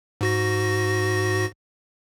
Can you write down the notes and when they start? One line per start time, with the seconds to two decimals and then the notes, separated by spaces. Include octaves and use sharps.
0.21 G#2 F#4 A#6